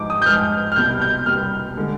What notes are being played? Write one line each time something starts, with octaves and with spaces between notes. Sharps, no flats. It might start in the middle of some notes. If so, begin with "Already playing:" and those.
Already playing: G#2 F3 G#3 D6
D#6
G6
G#2 F3 G#3 F6
F6
C2 B2 G3 G6
G6
C2 B2 G3 F6
D3 G#3